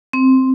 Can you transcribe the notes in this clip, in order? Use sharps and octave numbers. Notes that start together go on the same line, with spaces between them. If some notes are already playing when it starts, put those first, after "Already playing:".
C4